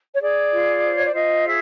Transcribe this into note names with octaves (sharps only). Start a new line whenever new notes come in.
C#5
G#4 D5
F4
C5
C#5
D5
F4 D#5
G#4 E5